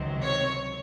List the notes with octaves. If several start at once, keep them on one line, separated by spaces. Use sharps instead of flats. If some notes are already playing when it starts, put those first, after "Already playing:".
Already playing: C#2 C3 D#3 F#3 C4
C#5